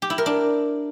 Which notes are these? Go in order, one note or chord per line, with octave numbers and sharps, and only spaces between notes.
G4
E4
A#4
D4